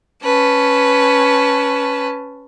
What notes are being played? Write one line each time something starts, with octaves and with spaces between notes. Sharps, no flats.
C#4 B4 A5